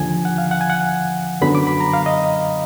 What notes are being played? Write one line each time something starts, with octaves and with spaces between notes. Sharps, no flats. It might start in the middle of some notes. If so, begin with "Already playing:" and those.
Already playing: D#2 D3 F3 G#5
F#5
F5
F#5
G#5
F#5
F#2 D3 F#3 B3 B5
D6
B5
A#5
F5
D#5